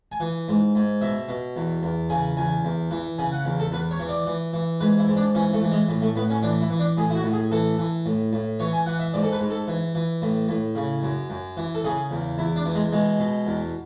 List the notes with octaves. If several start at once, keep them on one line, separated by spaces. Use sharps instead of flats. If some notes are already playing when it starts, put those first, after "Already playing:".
G#5
E3
G#2
G#2
B2 E5
B2
E2
E2
C#3 G#5
E2 G#5
E2
E3
C#3 G#5
F#5
E2
A4
E2 B4
C#5
E3
D5
E3
E3
G#2 B4
E4
G#2
D4
E3 C#4
A3
E3
G#3
A2
A3
A2 B3
C#4
E3 D4
E4
E3
D4
A2 G#4
E4
F#4
A2
G#4
E3 A4
E3
A2
A2
E3 C#5
G#5
E3 F#5
E5
G#2 D5
A4
B4
G#2
A4
E3
E3
A2
A2
C#3
F#2
F#2
E3
A4
C#3 G#4
E2
E2 E4
D4
E3
G#3
B2 G#3
B2
E2